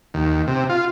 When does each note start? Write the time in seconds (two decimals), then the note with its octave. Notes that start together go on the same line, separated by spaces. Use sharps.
0.14 D#2
0.47 C3
0.69 F4